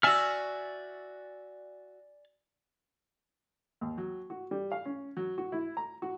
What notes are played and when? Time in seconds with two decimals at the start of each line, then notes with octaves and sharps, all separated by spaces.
0.03 F#4 D5 E5 G#5 F6
3.81 D#2
3.98 F#3
4.30 F#4
4.51 G3
4.72 F5
4.85 C#4
5.17 F#3
5.38 F#4
5.52 E4
5.77 A#5
6.02 F#4